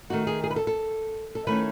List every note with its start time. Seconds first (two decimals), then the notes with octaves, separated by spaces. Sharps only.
0.10 D#3 A3 D#4 F#4
0.27 G#4
0.44 G#4
0.50 B4
0.56 A4
0.67 A4
1.35 A4
1.47 D#3 A3 C#4 E4 B4